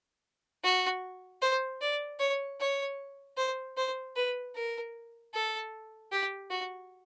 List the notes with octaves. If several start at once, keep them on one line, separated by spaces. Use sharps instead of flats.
F#4
C5
D5
C#5
C#5
C5
C5
B4
A#4
A4
G4
F#4